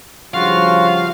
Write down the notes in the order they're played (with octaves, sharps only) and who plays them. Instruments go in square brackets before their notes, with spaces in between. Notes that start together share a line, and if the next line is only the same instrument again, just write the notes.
[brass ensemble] G2 C#3 F3 [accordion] F4 F#4 [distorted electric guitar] F5